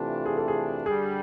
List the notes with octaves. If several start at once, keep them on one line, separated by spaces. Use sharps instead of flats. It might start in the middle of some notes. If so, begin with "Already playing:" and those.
Already playing: C3 E3 A3 D4 F4
G#4
A4
G#4
G2 D3 G3 G#4